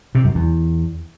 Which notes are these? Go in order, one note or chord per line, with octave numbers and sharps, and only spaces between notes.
C3
F#2
E2